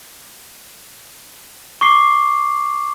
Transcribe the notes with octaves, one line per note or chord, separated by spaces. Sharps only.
C#6 D6 C7